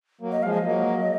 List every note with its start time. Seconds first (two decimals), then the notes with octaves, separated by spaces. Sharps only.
0.21 F#3 A#3
0.32 D#5
0.43 F3 G#3 F5
0.53 D#5
0.65 F#3 A#3